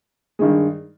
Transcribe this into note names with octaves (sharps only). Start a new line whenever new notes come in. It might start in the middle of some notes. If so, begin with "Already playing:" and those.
G2 D#3 G#3